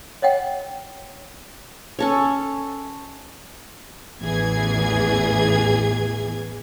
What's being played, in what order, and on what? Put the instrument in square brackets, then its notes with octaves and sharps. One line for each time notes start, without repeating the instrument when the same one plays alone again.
[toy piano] C#5 D#5 F#5 G5
[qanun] C#4 A4 C#5
[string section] A1 E2 E3 G#4 G#6